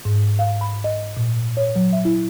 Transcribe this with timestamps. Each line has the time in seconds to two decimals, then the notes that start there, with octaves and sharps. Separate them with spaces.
0.05 G#2
0.39 F5
0.61 B5
0.84 D#5
1.17 A#2
1.57 C#5
1.76 F#3
1.93 E5
2.05 E4